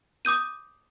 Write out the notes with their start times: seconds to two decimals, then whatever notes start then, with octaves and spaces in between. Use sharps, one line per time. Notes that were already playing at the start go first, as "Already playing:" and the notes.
0.25 D6 D#6 G6 D#7